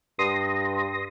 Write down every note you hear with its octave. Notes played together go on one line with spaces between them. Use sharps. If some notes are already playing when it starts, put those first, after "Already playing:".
G2 C6 D#6 A#6